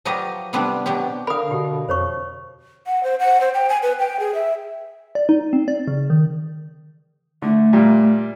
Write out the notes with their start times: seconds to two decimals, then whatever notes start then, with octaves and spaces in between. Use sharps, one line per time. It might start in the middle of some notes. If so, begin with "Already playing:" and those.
0.05 F3 F#3 G4 B4 D#5
0.53 C3 G3 B3 C4 D4 B4
0.86 B2 F#3 G4
1.27 D3 A#4 F5 B5 D#6
1.51 B2 G4
1.89 F2 C5 C#5 C#6
2.87 F#5
3.04 C5
3.20 F#5
3.41 C5
3.54 G5
3.69 G#5
3.82 B4
3.99 G5
4.20 G#4
4.35 E5
5.15 D5
5.29 D#4
5.53 C4
5.68 D5
5.88 C#3
6.10 D#3
7.42 D3 A3
7.73 A#2 G3 F4